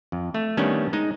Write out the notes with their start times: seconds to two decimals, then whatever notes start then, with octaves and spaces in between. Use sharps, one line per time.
0.12 F2
0.34 A3
0.57 D#3 G3 A3 B3 C#4 D4
0.93 G#3 D#4